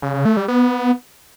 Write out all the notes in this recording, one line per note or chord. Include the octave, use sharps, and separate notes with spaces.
C#3
C#3
A3
G3
B3